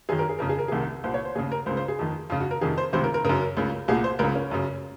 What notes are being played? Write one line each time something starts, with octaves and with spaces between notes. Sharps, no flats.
F#2 D#3 G#4
A#4
G#4
F2 C#3 A#4
G#4
A#4
C2 C3 D#3 G#4
C2 A#2 C5
C#5
C5
D#2 C#3 G#4
A#4
C#2 C#3 C5
C5
G#4
F2 D#3
F2 C#3 F4
F#4
A#4
F2 C3 D#3 G#4
C5
C#2 C3 D#3 C5
A#4
A#4
F#2 C#3 A#4
C#2 C#3
C2 A#2 G#4
C5
C#2 C#3 A#4
C#4
F#2 C#3